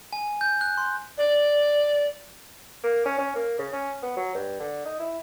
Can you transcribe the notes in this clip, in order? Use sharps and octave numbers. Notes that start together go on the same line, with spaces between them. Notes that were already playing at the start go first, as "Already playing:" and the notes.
G#5
G6
F#6
C6
D5
A#3
C#4
C#4
A#3
C#3
C#4
B3
F#3
G2
D3
D#4
E4